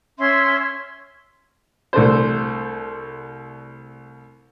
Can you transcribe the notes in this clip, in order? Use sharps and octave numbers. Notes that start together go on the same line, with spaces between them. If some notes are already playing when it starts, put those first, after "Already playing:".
C#4 E5 C6
C2 A3 D4 C5